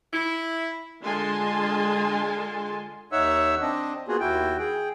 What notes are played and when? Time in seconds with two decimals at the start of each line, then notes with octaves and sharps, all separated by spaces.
0.12 E4
1.03 D3 G#3 F4 G#5 A5 C6
3.12 D#2 D#4 C#5 E5 F#5 E6
3.62 C4 D4 D#5
4.08 A#3 B3 F4 F#4 G#4
4.20 D#2 E4 F#4 G5
4.59 G#4 G5